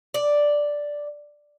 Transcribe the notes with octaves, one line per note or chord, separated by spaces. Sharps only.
D5